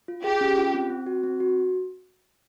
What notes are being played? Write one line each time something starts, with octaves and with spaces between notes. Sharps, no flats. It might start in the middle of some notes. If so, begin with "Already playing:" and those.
F4
G4 G#4
C#4
F4
C4
C4
F#4
C4
F#4